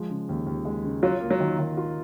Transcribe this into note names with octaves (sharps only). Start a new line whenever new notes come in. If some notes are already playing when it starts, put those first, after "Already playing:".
Already playing: F3 G#3
C#3
D#2
D#2
G#3
C#3
F#3 F4
A#3
F#3
D#3
D#3
F4